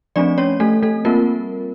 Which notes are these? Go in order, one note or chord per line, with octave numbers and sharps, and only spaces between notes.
F3 A3 C4 D4 D5
C#4 C#5
A3 A4
A3 A4
G3 A#3 C4 F4 A#4